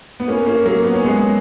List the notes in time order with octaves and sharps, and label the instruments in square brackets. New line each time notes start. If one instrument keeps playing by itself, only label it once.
[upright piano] B3
A#3 C#4
A#3 C#4
F#3 A#3
B3
C#4
G#3 B3